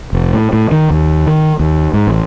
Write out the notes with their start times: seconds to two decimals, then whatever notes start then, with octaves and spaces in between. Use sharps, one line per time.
0.13 F1
0.33 A2
0.53 A2
0.72 D#3
0.90 D#2
1.27 D#3
1.60 D#2
1.93 G#2
2.07 A1